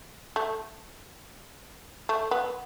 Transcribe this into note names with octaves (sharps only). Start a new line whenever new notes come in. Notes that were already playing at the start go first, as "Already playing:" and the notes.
A3
A3
B3